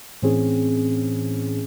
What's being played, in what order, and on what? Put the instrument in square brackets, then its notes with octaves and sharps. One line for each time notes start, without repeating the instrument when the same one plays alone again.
[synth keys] A2 E3 C4 C#4 G#4